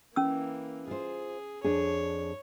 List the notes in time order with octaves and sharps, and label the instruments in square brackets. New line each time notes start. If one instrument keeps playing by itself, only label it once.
[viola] E3 A#3 [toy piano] C#4 E6
[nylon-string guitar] F4 C5 [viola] G#4
[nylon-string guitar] F2 D4 G#4 [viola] C#5